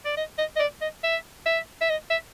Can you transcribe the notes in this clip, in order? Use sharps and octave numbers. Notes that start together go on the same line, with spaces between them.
D5
D#5
D#5
D#5
D5
D#5
E5
E5
E5
D#5
E5